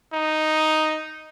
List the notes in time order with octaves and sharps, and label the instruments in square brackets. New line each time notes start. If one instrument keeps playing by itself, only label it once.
[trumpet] D#4